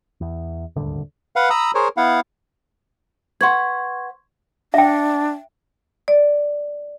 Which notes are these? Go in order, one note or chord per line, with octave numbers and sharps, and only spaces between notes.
E2
D#1 G#1 D2 D3
B4 F5 F#5
A#5 B5 D#6 E6
G#4 A#4 C5 C#5
B3 E4 F5 F#5
B4 F#5 C6 C#6 G#6
D4 E5 G5
D5